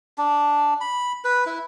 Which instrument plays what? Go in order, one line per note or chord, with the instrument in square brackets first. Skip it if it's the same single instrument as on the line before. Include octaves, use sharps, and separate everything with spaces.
[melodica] D4
B5
B4
E4